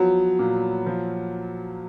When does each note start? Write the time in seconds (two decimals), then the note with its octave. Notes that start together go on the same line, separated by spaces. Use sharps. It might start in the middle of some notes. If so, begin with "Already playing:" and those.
Already playing: F3 F#3 B3
0.39 A#2
0.87 F3